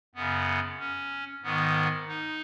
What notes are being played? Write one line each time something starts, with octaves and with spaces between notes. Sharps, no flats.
F#2 C#3 B3
C#4
G#2 D#3 B3
D#4